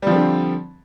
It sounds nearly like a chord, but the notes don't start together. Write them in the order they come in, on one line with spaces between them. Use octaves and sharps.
G3 F3 C4 D3